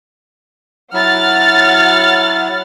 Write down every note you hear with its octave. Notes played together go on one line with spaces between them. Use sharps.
F#3 E4 F#5 F6 A6